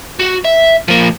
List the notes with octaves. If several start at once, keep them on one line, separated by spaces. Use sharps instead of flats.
F#4
E5
F3 A#3